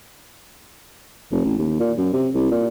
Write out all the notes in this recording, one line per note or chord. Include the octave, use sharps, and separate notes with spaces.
F1
A1
D#2
A#2
F#2
C3
C2
A#2